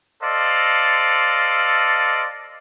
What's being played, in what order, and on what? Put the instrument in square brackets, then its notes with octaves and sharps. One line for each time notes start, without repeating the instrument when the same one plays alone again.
[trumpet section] A4 C5 D5 D#5 F5